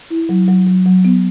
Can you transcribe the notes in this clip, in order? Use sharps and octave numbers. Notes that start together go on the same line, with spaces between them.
E4
F#3
F#3
F#3
F#3
B3